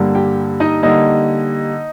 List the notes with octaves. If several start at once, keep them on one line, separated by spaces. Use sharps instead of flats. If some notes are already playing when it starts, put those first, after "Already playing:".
Already playing: G2 D3 G3 A#3
G4 G5
D#4 D#5
D3 G3 A#3 D#4 D#5